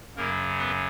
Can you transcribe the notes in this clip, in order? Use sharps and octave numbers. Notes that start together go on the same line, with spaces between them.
F#2 C#3 F#3 A#3 A#4
B3 B4